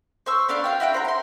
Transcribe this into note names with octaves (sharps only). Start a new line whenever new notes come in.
C5 C#6 E6
B3 D4 F5 C6
F#4 F5 G5
E4 F#4 F5 G5
E4 C5 F#5 A#5
A#5 C6